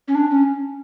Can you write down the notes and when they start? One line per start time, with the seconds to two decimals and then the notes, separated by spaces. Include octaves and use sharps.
0.08 C#4
0.15 D4
0.31 C#4